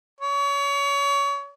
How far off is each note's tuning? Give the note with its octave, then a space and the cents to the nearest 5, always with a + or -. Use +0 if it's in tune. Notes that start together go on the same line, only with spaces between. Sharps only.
C#5 +30